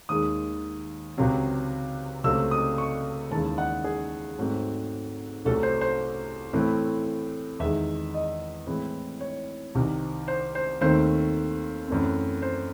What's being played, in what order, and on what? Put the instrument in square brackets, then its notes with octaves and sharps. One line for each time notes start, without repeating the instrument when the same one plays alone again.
[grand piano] D#2 D#3 G#3 D#6
C#2 C3 F#3 C4
C#2 C3 F#3 A3 C4 E6
D#6
C#6
D#2 C#3 E3 G#3 A5
F#5
G#4
G#2 F#3 A3 C4
C2 C3 F#3 A3 A4
C5
C5
A2 E3 A3 C4
E2 D#3 G#3 E5
D#5
A2 E3 G#3 C4
C#5
C2 C3 D#3
C5
C5
D#2 D#3 A3 C4 C5
F#2 E3 A3 C4
C5